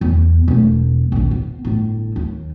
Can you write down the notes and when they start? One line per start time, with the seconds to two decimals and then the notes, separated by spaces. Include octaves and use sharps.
0.01 E2
0.48 E1 A3
1.12 A#1 D#2
1.31 B3
1.65 G1 A2
2.16 D#2